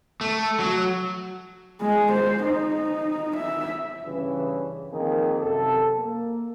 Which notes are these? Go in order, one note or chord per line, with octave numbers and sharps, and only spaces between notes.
A3
F#3
G#3
C5
D#4
E5
G2 C#3 E3
D#3 F3 A#3 C4 G#4
F#2 C3 A4
A#3